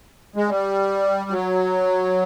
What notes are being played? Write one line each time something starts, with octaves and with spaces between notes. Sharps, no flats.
G#3
G3
F#3